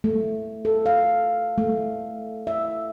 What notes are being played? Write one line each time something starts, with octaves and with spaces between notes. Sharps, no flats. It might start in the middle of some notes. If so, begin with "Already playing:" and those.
A3
A4
F5
A3
E5